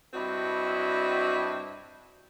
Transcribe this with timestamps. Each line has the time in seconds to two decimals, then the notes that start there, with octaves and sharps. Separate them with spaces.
0.14 G2 C4 D4 E4 F#4 D#5